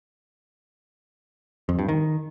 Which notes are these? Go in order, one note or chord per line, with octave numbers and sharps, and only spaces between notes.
F2
G2
D#3